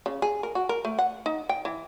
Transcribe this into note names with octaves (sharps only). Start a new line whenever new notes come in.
C#3
G#4
A#4
F#4
A#4
A3
F#5
D#4
G5
E3